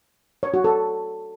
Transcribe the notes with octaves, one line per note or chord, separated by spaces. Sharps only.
C#5
F#4
A4